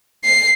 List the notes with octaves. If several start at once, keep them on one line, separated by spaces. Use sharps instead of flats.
C7